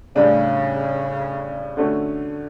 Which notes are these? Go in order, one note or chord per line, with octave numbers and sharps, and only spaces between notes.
A2 C#3 G3 D4
D3 A3 C#4 F#4